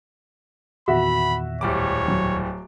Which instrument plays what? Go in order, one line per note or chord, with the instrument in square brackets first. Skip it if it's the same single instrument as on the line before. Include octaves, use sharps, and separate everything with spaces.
[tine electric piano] E2 A#2 D#3 [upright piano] F#4 E5 F#5 [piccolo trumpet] B5
[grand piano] D1 G3 D6 [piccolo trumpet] C#5
[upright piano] F#3